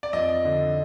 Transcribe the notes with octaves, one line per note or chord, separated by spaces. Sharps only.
D5
F2 D#5
D3